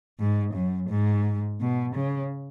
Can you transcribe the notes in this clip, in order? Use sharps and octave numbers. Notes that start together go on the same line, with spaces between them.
G#2
F#2
G#2
B2
C#3